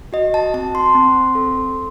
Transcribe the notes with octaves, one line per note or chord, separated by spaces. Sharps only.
F#4 D#5
A5
C4 A5
C6
C4
A4